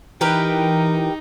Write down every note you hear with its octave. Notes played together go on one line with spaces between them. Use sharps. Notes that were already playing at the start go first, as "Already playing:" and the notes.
E3 D#4 G4 A#4 B4